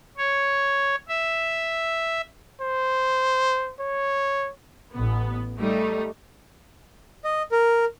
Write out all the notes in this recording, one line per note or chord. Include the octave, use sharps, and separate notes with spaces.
C#5
E5
C5
C#5
A1 B3
G3 A3 D#4
D#5
A#4